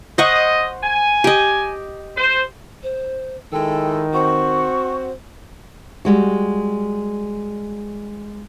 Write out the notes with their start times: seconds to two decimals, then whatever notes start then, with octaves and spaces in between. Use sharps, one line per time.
0.18 C5 D#5 F#5 C#6
0.82 G#5
1.24 G4 D#5
2.16 C5
2.83 C5
3.52 D#3 G#3 E4 A4 G5
4.13 C4 F#4 C5 C#6
6.05 G3 G#3 F#4